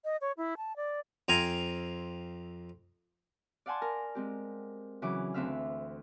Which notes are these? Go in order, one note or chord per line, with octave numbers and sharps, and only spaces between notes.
D#5
C#5
E4
A5
D5
F2 C4 F5 G#5 A#5
D5 F5 F#5 G#5 A5 C6
A#4
G#3 C4 G4
C#3 E3 F#3 D6
D2 E3 C4 E5 F5 F6